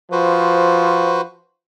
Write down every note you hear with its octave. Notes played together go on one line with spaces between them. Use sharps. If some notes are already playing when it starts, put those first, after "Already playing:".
F3 F#4 B4 C5